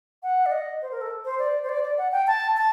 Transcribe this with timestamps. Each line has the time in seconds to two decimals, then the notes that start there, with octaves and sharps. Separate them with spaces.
0.23 F#5
0.46 D5
0.51 D#5
0.82 C5
0.91 A#4
1.01 A4
1.25 C5
1.39 D5
1.63 C5
1.69 D5
1.84 D5
1.98 F#5
2.12 G5
2.27 A5
2.57 A5